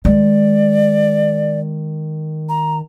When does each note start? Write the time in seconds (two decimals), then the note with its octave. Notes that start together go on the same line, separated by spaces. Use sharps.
0.05 D#3 G#3 D5
2.49 A#5